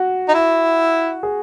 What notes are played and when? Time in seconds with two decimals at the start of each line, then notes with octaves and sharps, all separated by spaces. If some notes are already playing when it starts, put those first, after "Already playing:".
Already playing: F#4
0.29 D#4
0.34 E4
1.23 G#4